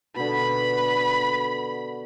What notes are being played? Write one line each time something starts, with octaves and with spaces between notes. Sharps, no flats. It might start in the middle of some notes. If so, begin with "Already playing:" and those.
B2 D3 B5